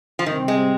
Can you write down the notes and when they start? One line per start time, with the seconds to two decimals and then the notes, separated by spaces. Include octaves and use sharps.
0.19 F3
0.26 C3 D#3 G3 C4
0.48 G#3